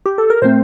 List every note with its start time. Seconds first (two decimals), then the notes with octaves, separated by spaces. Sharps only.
0.06 G4
0.18 A4
0.30 A#4
0.42 A#2 A3 C4 C5